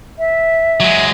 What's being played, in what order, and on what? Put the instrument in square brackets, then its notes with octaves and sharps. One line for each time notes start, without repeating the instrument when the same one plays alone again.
[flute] E5
[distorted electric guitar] F#3 G#3